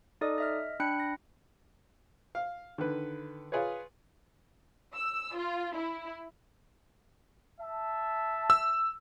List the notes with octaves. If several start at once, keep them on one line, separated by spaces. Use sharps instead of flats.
D#4 A4 D5 D#5 D#6
D#5 E5 F6
D4 G5 B5 F#6 C#7
A#6
F5
D3 D#3 B4
F4 G#4 B4 C#5
E6
F4
E4
E5 A5
E6